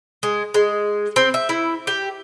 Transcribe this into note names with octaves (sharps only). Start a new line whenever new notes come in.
G#3
G#3
C4
E5
E4
G4